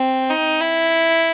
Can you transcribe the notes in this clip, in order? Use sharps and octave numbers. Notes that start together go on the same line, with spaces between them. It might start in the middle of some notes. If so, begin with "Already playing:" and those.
Already playing: C4
D#4
E4